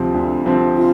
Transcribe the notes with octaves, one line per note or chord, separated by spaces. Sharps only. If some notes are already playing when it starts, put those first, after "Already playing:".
Already playing: D2 C3 F3 C4
D2
C3 F3 C4
F4